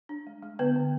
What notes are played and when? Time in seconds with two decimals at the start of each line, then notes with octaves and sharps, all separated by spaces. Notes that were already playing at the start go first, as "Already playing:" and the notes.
0.09 D4
0.27 G#3
0.43 G#3
0.59 D3 B3 B4
0.76 D3